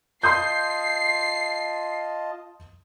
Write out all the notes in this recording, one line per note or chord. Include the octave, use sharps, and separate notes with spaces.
F4 D#5 A5 C6 D#6 G6 C7